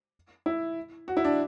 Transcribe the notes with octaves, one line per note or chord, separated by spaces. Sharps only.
E4
F#4
E4
D4